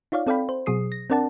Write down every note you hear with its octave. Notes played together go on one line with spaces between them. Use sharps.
D#4 F4 C#5 D5 F5
C4 A4 D5 F5 G5 B5
C5
B2 F#3 G#4 D#6 C7
A#6
C4 D4 A#4 D5 F#5 A5